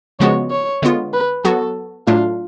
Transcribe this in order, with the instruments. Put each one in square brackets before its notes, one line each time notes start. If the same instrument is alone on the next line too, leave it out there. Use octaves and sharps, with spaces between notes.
[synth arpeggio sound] C#3 F3 G#3 B3 F#4 [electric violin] C#5
[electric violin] C#5
[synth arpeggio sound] D3 G#3 B3 F4
[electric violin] B4
[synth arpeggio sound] F#3 B3 F#4 [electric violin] A4
[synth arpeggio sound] A2 F#3 A3 D4 [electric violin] F4